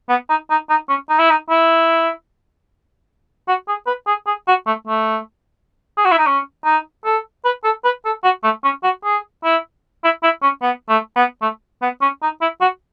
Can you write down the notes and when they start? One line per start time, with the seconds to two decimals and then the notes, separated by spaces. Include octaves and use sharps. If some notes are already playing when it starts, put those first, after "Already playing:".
0.09 B3
0.29 D#4
0.50 D#4
0.70 D#4
0.89 C#4
1.09 D#4
1.19 E4
1.30 D#4
1.49 E4
3.48 F#4
3.68 G#4
3.87 B4
4.07 G#4
4.26 G#4
4.48 F#4
4.67 A3
4.87 A3
5.97 G#4
6.05 F#4
6.12 E4
6.18 D#4
6.26 C#4
6.65 D#4
7.05 A4
7.45 B4
7.64 A4
7.84 B4
8.05 A4
8.24 F#4
8.44 A3
8.64 C#4
8.84 F#4
9.04 G#4
9.44 E4
10.04 E4
10.23 E4
10.42 C#4
10.62 B3
10.89 A3
11.16 B3
11.42 A3
11.82 B3
12.01 C#4
12.22 D#4
12.41 E4
12.61 F#4